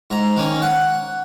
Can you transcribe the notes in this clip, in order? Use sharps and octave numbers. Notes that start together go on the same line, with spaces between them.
G#2 A#5
D#3 A#3 C#4
F#5